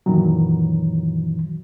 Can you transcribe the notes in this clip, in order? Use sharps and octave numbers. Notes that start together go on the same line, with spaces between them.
F#2 A#2 D#3 E3 F#3